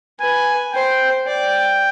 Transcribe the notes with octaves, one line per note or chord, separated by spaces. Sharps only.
B4 G#5
C5 G5
D5 G5